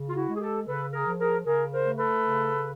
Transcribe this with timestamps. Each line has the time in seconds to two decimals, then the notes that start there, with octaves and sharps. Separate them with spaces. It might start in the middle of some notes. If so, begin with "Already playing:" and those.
Already playing: C#3
0.09 F4
0.15 E4 F#4
0.28 G#3
0.35 G#4
0.40 G4 A4
0.66 C#3 A4 B4
0.93 G#4 A#4
1.06 F3
1.18 G#4 A#4
1.45 C#3 G#4 A#4
1.71 A#4 C5
1.84 A3
1.97 A4 B4
2.23 C#3